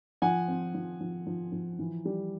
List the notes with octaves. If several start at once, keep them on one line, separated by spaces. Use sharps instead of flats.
F3 F#5 G#5
C4
F3
F3
F3
F3
E3
G3